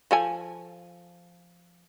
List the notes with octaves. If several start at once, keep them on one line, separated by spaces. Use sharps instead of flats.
F3 A4 G#5